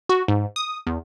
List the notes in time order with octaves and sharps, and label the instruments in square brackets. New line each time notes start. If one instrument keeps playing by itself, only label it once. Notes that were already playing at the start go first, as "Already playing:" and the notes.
[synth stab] F#4
G#2
D#6
E2